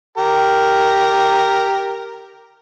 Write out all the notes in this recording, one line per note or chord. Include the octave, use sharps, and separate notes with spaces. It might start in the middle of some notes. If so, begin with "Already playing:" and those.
G4 A#4